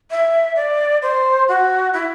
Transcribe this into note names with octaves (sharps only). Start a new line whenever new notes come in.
E5
D5
C5
F#4
E4